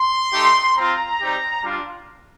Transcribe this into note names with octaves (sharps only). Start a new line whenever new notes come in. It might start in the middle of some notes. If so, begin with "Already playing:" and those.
Already playing: C6
A3 D#4 G4
C4 F4 A#5
G3 C4 D#4 G4
G3 D4 F4